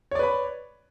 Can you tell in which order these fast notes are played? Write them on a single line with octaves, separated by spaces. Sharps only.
C#5 D5 B4 B5